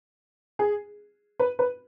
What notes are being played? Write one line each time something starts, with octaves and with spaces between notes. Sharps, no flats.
G#4
B4
B4